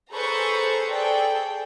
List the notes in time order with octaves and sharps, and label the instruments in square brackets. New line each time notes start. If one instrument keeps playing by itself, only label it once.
[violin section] G#4 A4 B4 C5 A#5 C#6
G#4 A4 D5 G5